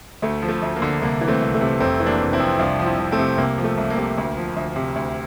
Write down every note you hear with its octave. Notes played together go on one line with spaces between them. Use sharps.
D2 A3
F3
A3
D2
A#3
D3
C2 A#3
E3
A3 C4
C2
A3
C3
F1 A3 C4
E3
A#3 D4
F1
C4 E4
F2
C2 D4 F4
F3
C4 E4
C2
A3 C4
C3
C2 A#3
F3
A3
C2
A#3
C3
D2
F3
D2
C3
D2